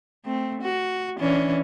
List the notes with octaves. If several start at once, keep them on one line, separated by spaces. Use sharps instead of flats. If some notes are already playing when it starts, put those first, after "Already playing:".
A3 C4
F#4
E3 C#4 D4